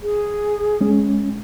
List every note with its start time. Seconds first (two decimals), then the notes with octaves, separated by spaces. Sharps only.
0.01 G#4
0.81 G#3 C#4